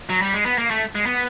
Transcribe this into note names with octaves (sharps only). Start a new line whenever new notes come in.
F#3
G3
G#3
B3
A#3
A3
G#3
B3